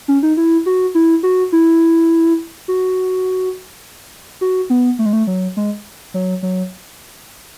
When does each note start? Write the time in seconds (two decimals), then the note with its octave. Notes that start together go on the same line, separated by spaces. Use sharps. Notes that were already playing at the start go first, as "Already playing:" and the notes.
0.08 C#4
0.23 D#4
0.37 E4
0.66 F#4
0.95 E4
1.23 F#4
1.52 E4
2.68 F#4
4.41 F#4
4.70 B3
4.99 A3
5.06 G#3
5.13 A3
5.27 F#3
5.57 G#3
6.14 F#3
6.43 F#3